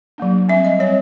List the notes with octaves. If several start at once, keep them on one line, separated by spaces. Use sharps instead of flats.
F#3 A#3 D4
G3 C4 E5
D#5
G3 C4 C#5